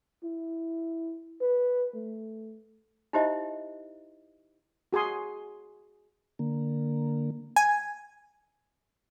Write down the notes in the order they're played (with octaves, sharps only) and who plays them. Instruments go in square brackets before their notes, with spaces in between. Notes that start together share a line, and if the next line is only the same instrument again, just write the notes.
[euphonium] E4
B4
A3
[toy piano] D#4 E4 G4 C5 D#5 E5
[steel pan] F#4 G#4 G#5 C6 D#6
[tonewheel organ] D3 A#3
[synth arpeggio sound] G#5